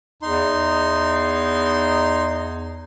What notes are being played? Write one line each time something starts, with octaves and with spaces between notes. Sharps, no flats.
E2 D#4 C6